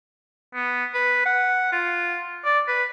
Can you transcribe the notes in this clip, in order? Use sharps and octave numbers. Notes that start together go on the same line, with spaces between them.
B3
B4
F#5
F4
D5
B4